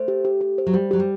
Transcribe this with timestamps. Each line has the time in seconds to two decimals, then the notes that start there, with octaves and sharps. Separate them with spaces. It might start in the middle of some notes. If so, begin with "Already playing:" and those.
Already playing: A3 C5
0.08 G4
0.25 G4
0.41 G4
0.58 C5
0.67 F#3
0.74 G3 C5
0.91 F#3 G4
1.00 G3